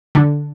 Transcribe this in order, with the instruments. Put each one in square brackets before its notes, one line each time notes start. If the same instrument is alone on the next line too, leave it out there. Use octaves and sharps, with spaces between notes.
[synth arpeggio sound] D3